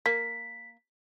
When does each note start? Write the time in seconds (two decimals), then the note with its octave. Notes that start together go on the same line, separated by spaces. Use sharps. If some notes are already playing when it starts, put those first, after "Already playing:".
0.06 A#3 B6